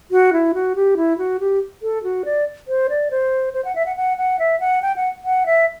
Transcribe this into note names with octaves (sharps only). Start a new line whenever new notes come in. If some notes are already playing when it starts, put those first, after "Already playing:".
F#4
E4
F#4
G4
E4
F#4
G4
A4
F#4
D5
C5
D5
C5
C5
F#5
E5
F#5
F#5
F#5
E5
F#5
G5
F#5
F#5
E5